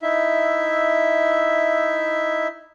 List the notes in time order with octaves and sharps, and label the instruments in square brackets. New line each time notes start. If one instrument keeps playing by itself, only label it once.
[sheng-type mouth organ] D#4 E4 E5